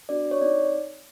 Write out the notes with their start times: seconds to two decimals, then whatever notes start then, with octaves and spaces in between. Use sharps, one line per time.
0.09 B3 D4 F#4 D5
0.31 C#5
0.41 C4 D#4 D5